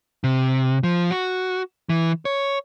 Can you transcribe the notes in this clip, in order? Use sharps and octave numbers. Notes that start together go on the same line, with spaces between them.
C3
F3
F#4
E3
C#5